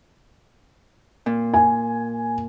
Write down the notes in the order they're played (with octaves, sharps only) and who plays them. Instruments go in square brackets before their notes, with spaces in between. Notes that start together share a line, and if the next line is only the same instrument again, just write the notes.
[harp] A#2
[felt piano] G#5